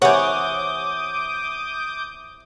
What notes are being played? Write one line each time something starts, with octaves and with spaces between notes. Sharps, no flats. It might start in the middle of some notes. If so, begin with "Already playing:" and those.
C3 E3 C#5 F#5 G#5 D6 D#6 G6